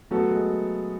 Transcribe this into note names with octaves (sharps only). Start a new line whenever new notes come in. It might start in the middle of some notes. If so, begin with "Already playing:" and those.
F#3 A3 B3 F#4 A4
G#3